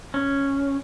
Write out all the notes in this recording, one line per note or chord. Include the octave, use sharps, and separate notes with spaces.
C#4